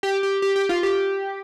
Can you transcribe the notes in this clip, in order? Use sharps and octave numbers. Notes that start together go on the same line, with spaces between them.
G4
G4
G4
G4
F4
G4